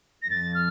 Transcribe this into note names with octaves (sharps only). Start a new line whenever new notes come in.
A#6
F2 A6
F6